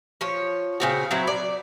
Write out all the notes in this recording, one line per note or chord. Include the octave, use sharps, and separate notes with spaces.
F3 C#5
C#3 C4 F#4
F#3 C4 E4
D5